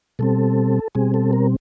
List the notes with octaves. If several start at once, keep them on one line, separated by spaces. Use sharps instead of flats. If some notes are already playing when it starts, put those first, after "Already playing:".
B2 G3 C4 A4
B2 G3 C4 G#4
A4
A#4